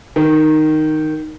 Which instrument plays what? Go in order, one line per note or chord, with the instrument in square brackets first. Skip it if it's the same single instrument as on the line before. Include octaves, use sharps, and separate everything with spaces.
[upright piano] D#3